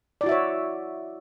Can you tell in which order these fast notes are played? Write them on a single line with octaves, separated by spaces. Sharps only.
D5 E4 F#4 E5 C#5